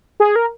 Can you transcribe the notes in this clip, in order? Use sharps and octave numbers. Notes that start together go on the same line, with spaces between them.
G#4
A#4